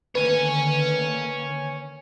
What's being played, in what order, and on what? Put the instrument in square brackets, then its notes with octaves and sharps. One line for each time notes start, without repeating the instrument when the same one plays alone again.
[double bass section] D3 D#3 A#3 [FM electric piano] B4 [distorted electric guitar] C#5 G#5